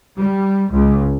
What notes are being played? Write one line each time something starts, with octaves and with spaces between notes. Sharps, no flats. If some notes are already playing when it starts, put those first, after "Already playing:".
G3
C#2